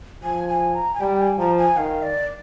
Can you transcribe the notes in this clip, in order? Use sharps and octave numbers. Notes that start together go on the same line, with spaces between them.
F3 G#5
G#5
A#5
G#5
G3 G5
G#5
F3 A#5
G#5
D#3 F5
D5